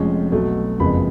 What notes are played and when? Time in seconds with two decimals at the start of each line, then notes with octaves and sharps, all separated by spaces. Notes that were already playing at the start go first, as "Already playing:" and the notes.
Already playing: F1 F2 F3 G#3 C#4
0.32 B1 B2 F#3 A3
0.80 F#1 F2 C#3 G#3 B3 B5